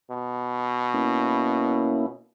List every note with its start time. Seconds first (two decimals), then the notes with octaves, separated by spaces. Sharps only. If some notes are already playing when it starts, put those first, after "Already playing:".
0.11 B2
0.94 A#3 C#4 E4